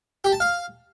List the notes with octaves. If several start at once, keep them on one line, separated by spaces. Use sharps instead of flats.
G4
A5
F5